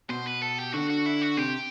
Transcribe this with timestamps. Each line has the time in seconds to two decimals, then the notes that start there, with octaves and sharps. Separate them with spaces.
0.09 B2 C5
0.26 B4
0.41 A4
0.58 G4
0.73 D3 F#4
0.90 F#4
1.06 E4
1.22 F#4
1.37 C3 G4